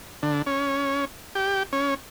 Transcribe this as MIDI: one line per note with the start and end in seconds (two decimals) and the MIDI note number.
0.23 0.42 50
0.46 1.05 61
1.35 1.63 67
1.73 1.94 61